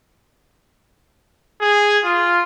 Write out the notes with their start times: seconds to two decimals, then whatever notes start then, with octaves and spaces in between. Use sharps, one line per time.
1.61 G#4
2.04 F4